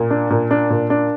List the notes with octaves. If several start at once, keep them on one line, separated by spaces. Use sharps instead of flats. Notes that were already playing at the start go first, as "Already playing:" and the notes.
Already playing: A#2
D4
A#2
D4
A#2
D4